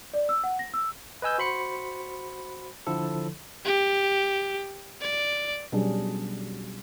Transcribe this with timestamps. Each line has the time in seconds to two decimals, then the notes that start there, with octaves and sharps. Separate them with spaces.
0.13 D5
0.29 E6
0.44 F#5
0.59 A#6
0.74 E6
1.22 B4 D#5 G#5 E6 G6
1.38 F#4 C5 B5 C6 C#7
2.87 D3 F3 E4 A4
3.65 G4
5.01 D5
5.72 B2 F#3 G3 C#4 D4 G#4